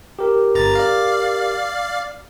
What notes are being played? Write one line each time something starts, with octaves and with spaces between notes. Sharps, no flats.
G4 A#4
G1 A#5 A6
D5 F5